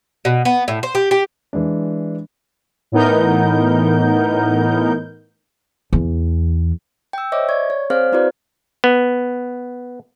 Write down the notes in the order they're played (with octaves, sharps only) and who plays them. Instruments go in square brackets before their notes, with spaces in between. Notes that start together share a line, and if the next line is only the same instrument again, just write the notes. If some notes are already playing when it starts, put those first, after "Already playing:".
[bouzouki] B2
B3
A2
C5
G4
G4
[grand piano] E3 G#3 D4
[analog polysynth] A2 E3 B3 D#4 A#4 G6
[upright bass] E2
[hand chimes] G5 E6
C5 C#5 D#5 E5 D6
D5 C#6 G#6
C#5
C4 G#4 C5 D5 F5 F6
C4 E4 F#4 B4 C5 D5
[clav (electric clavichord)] B3